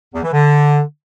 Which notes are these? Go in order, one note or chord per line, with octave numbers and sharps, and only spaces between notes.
E2
E3
D3